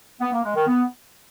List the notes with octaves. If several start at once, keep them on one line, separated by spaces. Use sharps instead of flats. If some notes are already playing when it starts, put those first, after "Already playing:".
B3
A#3
G#3
D#3
B3